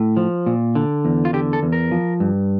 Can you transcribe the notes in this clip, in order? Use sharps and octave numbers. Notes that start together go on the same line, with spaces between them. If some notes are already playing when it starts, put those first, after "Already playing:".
Already playing: A2
F3
A#2
D3
E2
F4
D3 G4
A4
E2
A#4
F3
G2